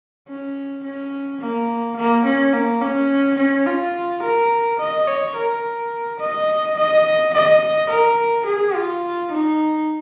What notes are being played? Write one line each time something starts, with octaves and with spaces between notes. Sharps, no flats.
C#4
C#4
A#3
A#3
C#4
A#3
C#4
C#4
F4
A#4
D#5
C#5
A#4
D#5
D#5
D#5
A#4
G#4
F4
D#4